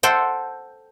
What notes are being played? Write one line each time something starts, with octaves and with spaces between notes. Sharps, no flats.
A4 C5 F#5 G5